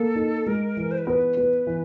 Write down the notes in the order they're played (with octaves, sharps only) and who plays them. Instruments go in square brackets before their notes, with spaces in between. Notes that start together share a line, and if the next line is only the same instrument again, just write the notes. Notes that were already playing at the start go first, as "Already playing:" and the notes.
Already playing: [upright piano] A#3 [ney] A4
[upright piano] D#4
[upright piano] G#3 [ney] A#4
[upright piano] E3
[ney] C5
B4
[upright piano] B3 [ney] A#4
[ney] B4
[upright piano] B3
E3